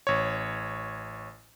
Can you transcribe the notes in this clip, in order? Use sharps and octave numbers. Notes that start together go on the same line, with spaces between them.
A1 C#5